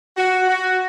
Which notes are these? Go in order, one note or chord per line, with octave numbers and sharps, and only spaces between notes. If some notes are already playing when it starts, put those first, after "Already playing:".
F#4
F#4